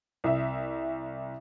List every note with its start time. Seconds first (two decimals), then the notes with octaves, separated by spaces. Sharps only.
0.24 C2 E5